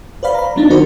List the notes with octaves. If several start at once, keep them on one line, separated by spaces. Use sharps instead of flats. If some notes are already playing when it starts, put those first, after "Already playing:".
B4 C5 D5 F5 B5
A#5 B5
F#3 B3 D4 D#4
D3 D#3 F#4 A#4 C5